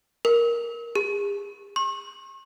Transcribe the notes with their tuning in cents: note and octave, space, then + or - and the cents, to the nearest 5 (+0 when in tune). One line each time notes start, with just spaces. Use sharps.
A#4 +10
G#4 -40
C#6 -45